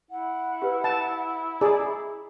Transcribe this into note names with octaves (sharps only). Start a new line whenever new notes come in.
E4 F#5
G4 B4
A5
G#4 D5 A#5